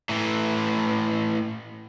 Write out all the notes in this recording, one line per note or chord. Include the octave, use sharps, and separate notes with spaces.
A2 E3